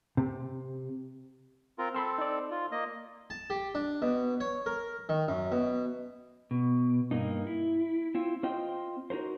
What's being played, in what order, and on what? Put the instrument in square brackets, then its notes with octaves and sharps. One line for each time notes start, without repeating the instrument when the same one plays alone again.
[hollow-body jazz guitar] C3
[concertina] C4 F4 A#4
[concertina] C4 A4 [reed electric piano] B5 C6 E6
[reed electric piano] D#4 D5
[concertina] F4
A#3 D#5
[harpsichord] A5
G4
D4
B2
C#5
A#4
D#3
F#2
B2
[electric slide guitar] B2
G2 A#3 D#4
E4
C4 E4 F4
C4 F4 C5 D#5 G5
D#4 F#4 A#4 C5